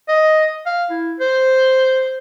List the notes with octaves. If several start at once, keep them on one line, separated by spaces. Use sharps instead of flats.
D#5
F5
E4
C5